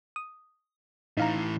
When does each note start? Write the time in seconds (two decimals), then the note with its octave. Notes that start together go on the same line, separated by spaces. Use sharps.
0.16 D#6
1.17 A2 E3 D#4 F5 A#5